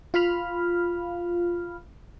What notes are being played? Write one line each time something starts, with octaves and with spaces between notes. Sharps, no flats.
F4 F5 B5 F6